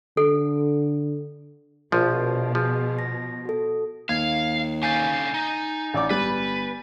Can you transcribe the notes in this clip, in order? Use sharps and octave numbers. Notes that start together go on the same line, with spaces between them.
D3 A4
A#1 B2 F3
F3 F4 G#4
A#6
F#4 A4
D#2 F5 G#6
D3 C#4 F5 G#5 G6 A6
D#4
A1 D5 D6
G1 G3 B4 A6